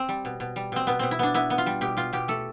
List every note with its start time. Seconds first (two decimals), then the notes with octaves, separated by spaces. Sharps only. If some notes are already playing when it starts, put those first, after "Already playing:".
Already playing: C4
0.09 G3
0.25 B2
0.40 B2
0.56 G3
0.72 B2 C4
0.87 B2 B3
0.99 B2 C4
1.11 E4
1.19 B3 D4
1.34 B3 E4
1.50 B3
1.58 F4
1.66 G3
1.81 B2 G4
1.97 B2 F4
2.13 B2 G4
2.28 A3 A4